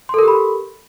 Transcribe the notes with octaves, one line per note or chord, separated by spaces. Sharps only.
G4 A4 A#4 B5 C6